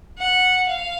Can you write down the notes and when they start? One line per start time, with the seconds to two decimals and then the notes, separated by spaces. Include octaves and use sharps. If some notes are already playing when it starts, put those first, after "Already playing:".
0.18 F#5
0.69 F5